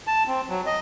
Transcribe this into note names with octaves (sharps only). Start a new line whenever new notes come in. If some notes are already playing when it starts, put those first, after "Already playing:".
A5
C4
F#3
D#5